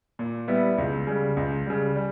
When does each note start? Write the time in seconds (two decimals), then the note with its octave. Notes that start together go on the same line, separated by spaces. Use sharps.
0.19 A#2
0.48 G3 B3 E4
0.78 C#2
1.07 C#3 G3
1.37 C#2
1.66 C#3 G3
1.96 G3